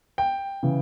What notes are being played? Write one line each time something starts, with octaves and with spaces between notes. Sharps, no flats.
G5
C#3 E3